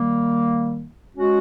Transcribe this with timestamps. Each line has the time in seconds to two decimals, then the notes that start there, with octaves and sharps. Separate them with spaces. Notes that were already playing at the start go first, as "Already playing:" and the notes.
Already playing: D#3 G3 A#3
1.16 G#3 C#4 F#4